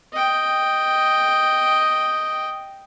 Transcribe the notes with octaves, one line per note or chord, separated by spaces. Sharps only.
D#5 G5